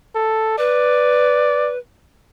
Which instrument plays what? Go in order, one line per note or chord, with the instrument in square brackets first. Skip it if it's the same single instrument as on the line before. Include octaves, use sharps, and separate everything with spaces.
[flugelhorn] A4
[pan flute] B4 [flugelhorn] D5